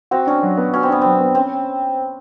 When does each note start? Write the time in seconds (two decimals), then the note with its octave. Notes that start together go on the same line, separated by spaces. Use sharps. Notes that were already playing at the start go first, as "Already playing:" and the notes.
0.11 C4 F#4
0.27 C#4 D4
0.43 F#3
0.57 B3
0.73 C#4 F#4
0.83 C4
0.89 B3 D4
1.01 F#3 C4
1.20 B3
1.35 C4 C#4